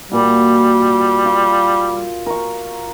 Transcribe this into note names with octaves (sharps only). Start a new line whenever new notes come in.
A#2 G3 F#4
F4
A#4 C#6